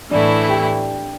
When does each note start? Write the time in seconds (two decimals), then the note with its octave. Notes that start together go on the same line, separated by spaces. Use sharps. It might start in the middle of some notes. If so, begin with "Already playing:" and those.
0.11 A2 E3 A3 D4 E4 D5
0.49 G4 G5